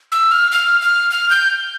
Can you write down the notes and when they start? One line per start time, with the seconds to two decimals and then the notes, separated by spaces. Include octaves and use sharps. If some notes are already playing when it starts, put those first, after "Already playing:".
0.12 E6
0.31 F6
0.52 F6
0.81 F6
1.11 F6
1.30 G6